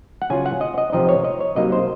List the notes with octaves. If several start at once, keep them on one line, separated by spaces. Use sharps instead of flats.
F#5
C#3 F#3 C#4 F4 G#5
F#5
D#5
D#5
C3 F3 C4 D#4 D#5
C#5
D#5
C#5
C3 F#3 A#3 D#4 D#5
C5